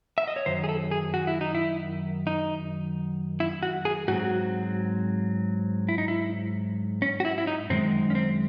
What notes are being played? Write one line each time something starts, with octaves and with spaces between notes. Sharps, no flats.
E5
D#5
C#5
F#2 D#3 C5
G#4
A4
G#4
F#4
E4
D#4
E4
D#4
E4
F#4
G#4
G#2 F#3 C4 F#4
E4
D#4
E4
C#4
F#4
E4
E4
D#4
F#2 D#3 G#3 C4
C#4
C4